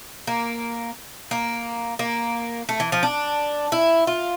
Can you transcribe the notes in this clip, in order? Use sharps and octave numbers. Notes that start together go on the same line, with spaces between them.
A#3
A#3
A#3
A3
E3
F3
D4
E4
F4